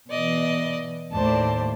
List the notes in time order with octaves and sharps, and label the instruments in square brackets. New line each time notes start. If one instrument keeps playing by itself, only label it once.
[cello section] B2 E3 [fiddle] D5 D#5
[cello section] D#2 A2 D5 [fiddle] C5 A5